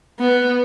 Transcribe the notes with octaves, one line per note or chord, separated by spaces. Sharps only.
B3